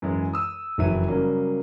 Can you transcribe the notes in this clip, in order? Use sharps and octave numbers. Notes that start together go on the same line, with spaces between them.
F#2 E3 G#3
D#6 E6
F#1 F2 E3 F#3 E5 D#7
C#3 F#3 G3 A#3